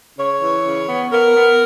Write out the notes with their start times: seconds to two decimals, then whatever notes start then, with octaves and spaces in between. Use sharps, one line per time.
0.18 C#3 C#5
0.41 E3
0.65 C#3
0.88 B3
1.12 B3 A#4
1.35 B3